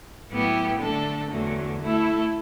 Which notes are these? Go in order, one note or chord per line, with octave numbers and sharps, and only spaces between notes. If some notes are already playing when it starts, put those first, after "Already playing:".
A2 F#3 B3 E4 G4
D3 A3 D4 A4
E2 D3 F#3 A3
A3 E4 A4